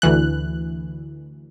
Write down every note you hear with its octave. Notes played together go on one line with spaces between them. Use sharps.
D2 E3 F#6